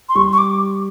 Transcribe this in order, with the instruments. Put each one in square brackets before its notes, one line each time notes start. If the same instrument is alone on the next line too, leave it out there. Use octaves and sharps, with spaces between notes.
[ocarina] C6
[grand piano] G3 [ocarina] C#6
[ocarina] C#6
D6